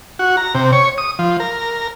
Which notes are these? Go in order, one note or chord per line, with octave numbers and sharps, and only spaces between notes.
F#4
A#5
C3
C#5
D#6
F3
A#4